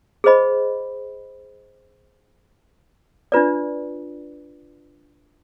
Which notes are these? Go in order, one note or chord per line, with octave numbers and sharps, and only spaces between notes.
G#4 C5 D#5 B5
D4 F4 B4 D5